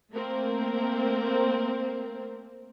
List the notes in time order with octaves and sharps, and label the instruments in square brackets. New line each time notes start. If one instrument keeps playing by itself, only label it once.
[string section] A3 A#3 C4 A#4